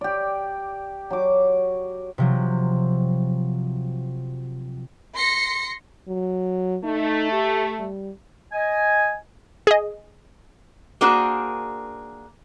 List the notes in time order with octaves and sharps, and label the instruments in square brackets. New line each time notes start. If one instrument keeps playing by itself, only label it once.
[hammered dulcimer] G4 D5
F#3 D6
[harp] C3 F3 F#3
[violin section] C6 A#6 C7 C#7
[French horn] F#3
[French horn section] A3 [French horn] D#4
[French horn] G4
G3
[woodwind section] D#5 G#5
[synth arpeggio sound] G#4 D#5
[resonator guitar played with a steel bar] A#3 D4 F#4 G#4 A#4 C5